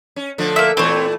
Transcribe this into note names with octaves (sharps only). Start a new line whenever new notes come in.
C#4
D3 F3 A3
A#3 E5
A#2 E3 A3 C4 C#5